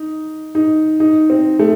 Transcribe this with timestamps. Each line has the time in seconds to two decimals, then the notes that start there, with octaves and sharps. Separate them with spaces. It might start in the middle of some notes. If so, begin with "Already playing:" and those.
Already playing: D#4
0.55 D#4
1.00 D#4
1.30 C4
1.59 A3